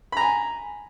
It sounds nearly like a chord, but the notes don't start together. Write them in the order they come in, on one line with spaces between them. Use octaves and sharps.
B5 A#5 G#5